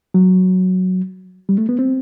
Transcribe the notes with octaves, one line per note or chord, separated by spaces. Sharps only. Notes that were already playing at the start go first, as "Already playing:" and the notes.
F#3
G3
A3
B3
C4